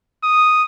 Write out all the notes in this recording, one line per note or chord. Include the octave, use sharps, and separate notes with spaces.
D#6